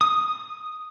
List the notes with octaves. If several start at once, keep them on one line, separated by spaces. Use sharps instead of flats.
D#6